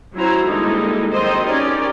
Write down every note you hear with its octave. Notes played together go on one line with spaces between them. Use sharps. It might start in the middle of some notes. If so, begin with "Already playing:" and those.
F#3 C#4 E4 F#4 C5 A#5
D3 G3 G#3 A#3 D#4 E4
D#3 F#3 C4 C5 D#5
C#4 D#4 G4 A#4 D5